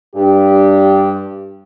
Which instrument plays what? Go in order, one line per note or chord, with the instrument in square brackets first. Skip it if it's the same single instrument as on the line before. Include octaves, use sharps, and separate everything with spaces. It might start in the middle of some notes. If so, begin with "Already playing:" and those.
[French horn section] G2 G4